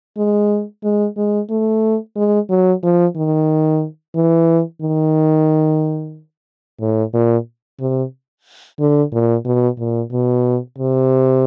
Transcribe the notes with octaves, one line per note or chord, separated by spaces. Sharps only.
G#3
G#3
G#3
A3
G#3
F#3
F3
D#3
E3
D#3
A2
A#2
C3
D3
A#2
B2
A#2
B2
C3